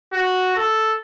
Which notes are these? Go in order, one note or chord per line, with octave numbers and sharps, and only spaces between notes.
F#4
A4